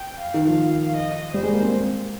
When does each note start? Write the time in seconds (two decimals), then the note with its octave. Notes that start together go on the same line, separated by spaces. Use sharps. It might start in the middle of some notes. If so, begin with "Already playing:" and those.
Already playing: G5
0.21 F5
0.34 D#3
0.47 F3
0.97 D#5
1.34 G3 C5
1.43 G#3
1.53 A#3
1.62 C4